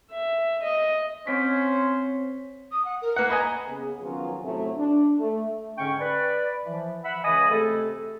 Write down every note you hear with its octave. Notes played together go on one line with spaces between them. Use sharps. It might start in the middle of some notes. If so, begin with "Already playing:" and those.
E5
D#5
C4 C#4 C5 C#5 B6
D#6
F#5
A#4
A#3 B4 F#5
B4 D#5 G#5 A#5
C#3 B3 G#4
D#3 F3 F#3 B3 C#4 F4
A2 C3 F#3 A3
D4
A3
G#2 D3 C#4 G5 C#6
B4 D5 B5
E3 F3
E5 F#5 B5
C#2 E3 D#5 G#5 B5 D#6
C3 A3 G#4 A4